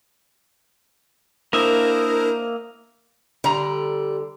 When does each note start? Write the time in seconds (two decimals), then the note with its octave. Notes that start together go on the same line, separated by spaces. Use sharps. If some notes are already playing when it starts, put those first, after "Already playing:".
1.53 A#3 D4 E4 A#4 C5 D#5 E5
3.44 D3 G3 A#5